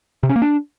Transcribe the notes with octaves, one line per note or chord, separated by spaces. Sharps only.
C3
C#4
A#3
D4